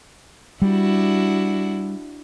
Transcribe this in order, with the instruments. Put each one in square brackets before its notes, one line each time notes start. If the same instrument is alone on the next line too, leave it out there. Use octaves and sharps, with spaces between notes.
[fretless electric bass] G3 [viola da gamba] D4 E4 F#4